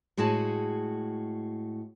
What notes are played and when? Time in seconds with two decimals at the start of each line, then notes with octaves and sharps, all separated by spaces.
0.17 A2 G#3 F#4 G#4 A5